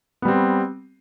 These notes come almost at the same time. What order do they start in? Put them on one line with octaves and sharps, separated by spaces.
B3 G3 C4